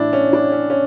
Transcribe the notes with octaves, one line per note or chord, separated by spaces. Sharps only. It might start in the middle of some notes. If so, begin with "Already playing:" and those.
Already playing: A2 E3 D4 E4
C#4
D4
C#4
C#4